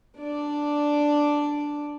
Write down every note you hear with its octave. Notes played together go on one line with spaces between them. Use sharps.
D4 D5